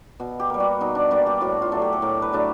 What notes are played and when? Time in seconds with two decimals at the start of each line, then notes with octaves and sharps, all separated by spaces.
0.20 B2
0.40 G4
0.50 G3 A#3
0.60 F#4
0.81 B2 D#4
0.95 D4
1.11 G3 A#3 D4
1.26 G4
1.41 A2 F#4
1.62 F4
1.72 F#3 A3 D4
1.82 G4
1.93 A4
2.02 A2 A#4
2.22 B4
2.32 F#3 A3 D4